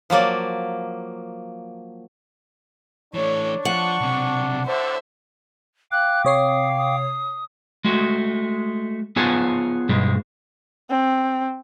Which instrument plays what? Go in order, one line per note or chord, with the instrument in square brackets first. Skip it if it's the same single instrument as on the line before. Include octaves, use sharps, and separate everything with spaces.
[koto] F3 F#3 A#3 D5
[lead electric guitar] E3 A3 [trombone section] D4 [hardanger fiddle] C#5
[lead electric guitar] F3 [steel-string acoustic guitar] F#5 [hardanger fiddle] C#6
[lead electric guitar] B1 C3
[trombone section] A2 D3 [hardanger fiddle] C5 E5
[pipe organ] F5 G5 D6 [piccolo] F#6
[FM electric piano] C3 C#5 C7 [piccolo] D#6
[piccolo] D#6
[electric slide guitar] G#3 A3 F#4
B3 F4 G#4 C#5 G#5 A5
G2 B2 G3 G#3
[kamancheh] C4